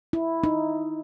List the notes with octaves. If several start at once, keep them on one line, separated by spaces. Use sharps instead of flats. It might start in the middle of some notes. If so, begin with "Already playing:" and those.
E4
D#4